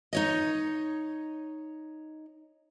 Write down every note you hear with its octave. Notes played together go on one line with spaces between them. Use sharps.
D#4 C#5 D#5